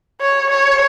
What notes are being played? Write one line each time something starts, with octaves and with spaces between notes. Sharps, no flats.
C#5
C#5